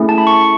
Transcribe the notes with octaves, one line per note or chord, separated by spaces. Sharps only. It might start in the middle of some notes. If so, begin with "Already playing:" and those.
Already playing: A3 C#4 E4 G#4
A5
B5
C#6